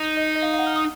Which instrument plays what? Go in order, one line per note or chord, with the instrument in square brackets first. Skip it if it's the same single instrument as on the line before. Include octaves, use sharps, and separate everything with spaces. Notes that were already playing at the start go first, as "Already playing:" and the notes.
Already playing: [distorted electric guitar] D#4
[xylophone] D#5
D#5
F5
F5
F#5
F6
D#6